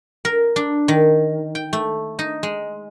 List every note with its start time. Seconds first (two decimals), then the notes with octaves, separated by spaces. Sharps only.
0.25 A#4
0.56 D4
0.88 D#3
1.55 G5
1.73 A3
2.19 D#4
2.43 G#3